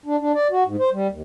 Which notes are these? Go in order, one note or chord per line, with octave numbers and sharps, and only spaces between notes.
D4
D4
D5
F#4
G#2
C5
G3
D#2